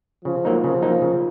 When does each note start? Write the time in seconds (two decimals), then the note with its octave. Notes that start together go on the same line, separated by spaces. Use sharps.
0.25 C#3 F3
0.45 F#3 A#3 D#4
0.63 C#3 F3
0.82 F#3 A#3 D#4
1.02 C#3